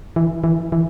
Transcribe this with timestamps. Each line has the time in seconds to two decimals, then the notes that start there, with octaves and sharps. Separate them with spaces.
0.16 E3
0.44 E3
0.72 E3